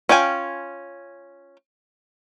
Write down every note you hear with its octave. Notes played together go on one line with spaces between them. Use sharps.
C#4 F4 G5 G#5